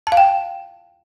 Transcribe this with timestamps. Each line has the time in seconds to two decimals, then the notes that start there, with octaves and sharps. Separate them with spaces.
0.07 A5
0.12 F5
0.17 G5